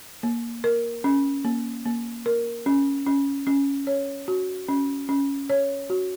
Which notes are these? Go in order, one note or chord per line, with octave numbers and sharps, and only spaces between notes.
A#3
A#4
C#4
A#3
A#3
A#4
C#4
C#4
C#4
C#5
F#4
C#4
C#4
C#5
F#4